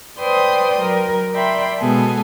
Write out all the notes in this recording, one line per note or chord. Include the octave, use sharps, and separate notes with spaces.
B4 C5 D5 G5 C6 D#6
F#3 A#4
D5 E5 G5 B5 C6
B2 G#3 B3 G#4 A4